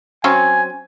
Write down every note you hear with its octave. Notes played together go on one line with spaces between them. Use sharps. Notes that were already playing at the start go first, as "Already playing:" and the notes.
F#3 C4 C#4 G#5